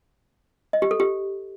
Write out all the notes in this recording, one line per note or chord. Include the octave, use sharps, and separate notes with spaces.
D#5
G4
A4
G4